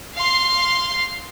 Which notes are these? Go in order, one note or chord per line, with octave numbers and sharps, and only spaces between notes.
F5 C6